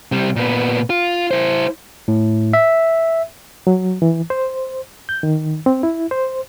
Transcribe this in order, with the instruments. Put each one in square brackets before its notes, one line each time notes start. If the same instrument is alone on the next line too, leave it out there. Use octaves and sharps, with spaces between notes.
[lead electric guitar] C3 G3
A#2 B3
F4
E4 C5
[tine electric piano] A2
E5
[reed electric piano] F#3
E3
C5
G6
D#3
C4
E4
C5